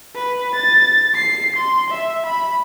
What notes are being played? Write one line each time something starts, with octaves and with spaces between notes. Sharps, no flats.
B4
A6
C7
C6
E5
B5